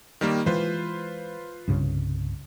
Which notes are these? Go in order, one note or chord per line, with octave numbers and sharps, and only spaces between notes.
D#3 G3 A#3
E3 G#3 F4 B4 C5
C2 G2 C#3